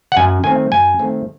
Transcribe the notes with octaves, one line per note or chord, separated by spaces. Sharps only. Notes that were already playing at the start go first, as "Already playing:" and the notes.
F#5
F#2 G#5
D#3 A3 C4 G#5
F#2 G#5
D#3 A3 C4